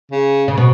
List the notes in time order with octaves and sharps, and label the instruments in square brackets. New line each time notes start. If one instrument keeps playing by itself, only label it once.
[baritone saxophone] C#3
[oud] C#3
B2